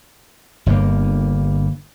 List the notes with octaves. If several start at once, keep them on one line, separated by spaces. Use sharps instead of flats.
G1 G2 D3 A#3